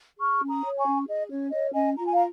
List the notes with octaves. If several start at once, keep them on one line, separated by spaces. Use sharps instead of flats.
G#4 C#6 F6
C#4
A#5 D#6
C#5
G#5 C#6
C#4
G#4 D#5
C#4 C#5
C#5 D#5
C#4 D#5 G#5
F4 A#5
G#5
F5 A#5